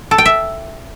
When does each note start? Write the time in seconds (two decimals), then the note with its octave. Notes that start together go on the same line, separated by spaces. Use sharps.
0.11 A4
0.18 G5
0.25 E5